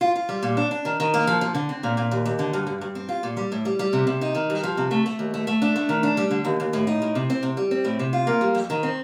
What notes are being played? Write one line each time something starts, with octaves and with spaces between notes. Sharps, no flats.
F4
F4
G3
A#2
D4
D4
D#3
D#3
A#3
F3
F3
D3
C4
A#2
A#2
D#2
D#2
D3
G2
G2
G2
C4
F4
A#2
G3
A2
G3
G3
C3
C3
D#4
D#3
G2
F3
C3
A3
A3
D#2
A3
A3
D4
A3
D#3
D4
G3
D3
D#2
D#2
A2
D#4
A2
C3
C4
C3
G3
C4
A2
C3
F4
A#3
G3
F2
D#3
C4